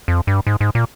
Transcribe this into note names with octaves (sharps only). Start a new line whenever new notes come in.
F2
G2
G#2
G#2
A#2